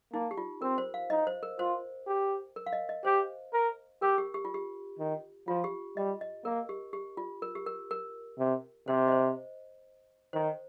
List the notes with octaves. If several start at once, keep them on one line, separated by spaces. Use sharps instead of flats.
A#3 D#4
G4
F4
C4 A#4
C5
F5
D#4 D#5
C5
A#4
F4 C5
G4
A#4
F5
D#5
D#5
G4 C5
A#4
G4 A#4
G4
G4
F4
G4
D#3
F3 F4
G4
G3 D#5
D#5
A#3 A#4
G4
G4
F4
A#4
G4
A#4
A#4
C3
C3 C5
D#5
C5
D#3 C5